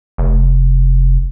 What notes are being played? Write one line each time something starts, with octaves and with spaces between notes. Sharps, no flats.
F1